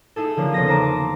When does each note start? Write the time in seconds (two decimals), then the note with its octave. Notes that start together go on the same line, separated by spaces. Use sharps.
0.16 D#4 E4 G#4 A4
0.36 D3 F3 A#3 C#4 D4
0.54 E1 C#3 B3 D#5 C6 A#6
0.68 C5 A5 A#5 D6